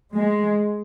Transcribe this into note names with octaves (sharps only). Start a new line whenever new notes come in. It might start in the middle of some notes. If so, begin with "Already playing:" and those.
G#3